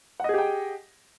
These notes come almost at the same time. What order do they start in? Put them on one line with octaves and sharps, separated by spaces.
F#5 D#5 G#4 G4 G5